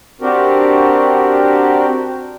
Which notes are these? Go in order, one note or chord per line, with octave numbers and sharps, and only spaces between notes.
C4 D4 F#4 G4 A#4